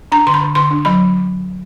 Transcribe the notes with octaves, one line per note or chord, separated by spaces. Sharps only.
D4 A#5
D3 C6
B5
D3
D3 C6
D4
F#3 B5